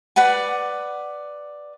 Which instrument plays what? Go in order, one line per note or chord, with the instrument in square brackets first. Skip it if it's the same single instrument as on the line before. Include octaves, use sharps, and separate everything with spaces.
[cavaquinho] B4 D5 F#5 G#5